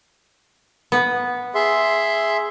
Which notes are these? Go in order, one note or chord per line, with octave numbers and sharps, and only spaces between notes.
B3
G#4 E5 C6